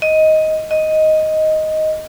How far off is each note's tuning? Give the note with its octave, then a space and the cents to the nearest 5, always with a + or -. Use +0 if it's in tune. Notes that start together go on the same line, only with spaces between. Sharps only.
D#5 +10
D#5 +5